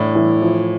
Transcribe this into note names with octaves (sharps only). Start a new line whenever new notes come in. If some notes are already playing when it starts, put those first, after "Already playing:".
Already playing: A2 E3 D4
E3
F3